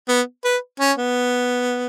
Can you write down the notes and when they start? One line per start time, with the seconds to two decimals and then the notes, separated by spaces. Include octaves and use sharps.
0.08 B3
0.44 B4
0.80 C#4
0.98 B3